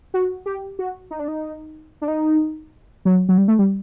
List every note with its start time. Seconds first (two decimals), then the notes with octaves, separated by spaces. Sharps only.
0.14 F#4
0.46 G4
0.79 F#4
1.11 D#4
1.19 D4
1.28 D#4
2.02 D4
2.08 D#4
3.05 F#3
3.29 F#3
3.38 G3
3.48 A3
3.59 G3